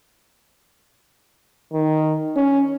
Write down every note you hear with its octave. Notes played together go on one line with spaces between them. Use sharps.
D#3
C#4